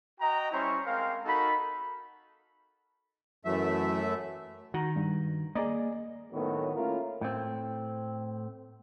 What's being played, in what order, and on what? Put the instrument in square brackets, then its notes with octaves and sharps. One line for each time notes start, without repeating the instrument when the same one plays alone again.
[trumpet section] F#4 D#5 G5 A#5
G3 C#4 E4 C5 C#5 C#6
G#3 C4 A#4 C5 F5
D#4 F#4 A4 A#4 B5
[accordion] F#2 A3 E5 [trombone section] E3 F#3
[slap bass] D#3 [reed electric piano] F#4
[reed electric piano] G2
[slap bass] A#3 [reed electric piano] G#4 D5 D#5
[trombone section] D2 A2 D#3 F#3 B3
A3 A#3 C#4 E4 F4 A#4
[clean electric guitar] A2 C4